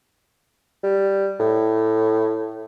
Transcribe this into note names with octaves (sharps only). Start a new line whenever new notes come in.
G3
A2